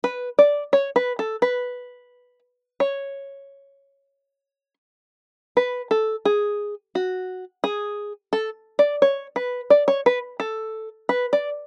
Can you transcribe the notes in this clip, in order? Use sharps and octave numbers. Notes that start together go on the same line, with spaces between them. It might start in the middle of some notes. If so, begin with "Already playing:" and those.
B4
D5
C#5
B4
A4
B4
C#5
B4
A4
G#4
F#4
G#4
A4
D5
C#5
B4
D5
C#5
B4
A4
B4
D5